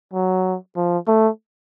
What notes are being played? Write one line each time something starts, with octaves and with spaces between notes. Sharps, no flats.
F#3
F3
A3